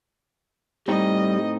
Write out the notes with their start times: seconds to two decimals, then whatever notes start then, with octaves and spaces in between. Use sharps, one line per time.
0.88 A2 G3 C4 D#4 D#5